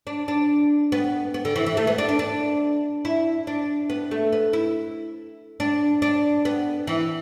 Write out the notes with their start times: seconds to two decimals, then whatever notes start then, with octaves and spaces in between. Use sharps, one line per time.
0.07 D4
0.28 D4
0.92 B3
1.34 B3
1.45 D3
1.56 E3
1.66 E3
1.77 A3
1.87 B3
1.98 D4
2.09 D4
2.19 D4
3.05 E4
3.47 D4
3.90 B3
4.11 A3
4.33 B3
4.53 E4
5.60 D4
6.02 D4
6.45 B3
6.87 E3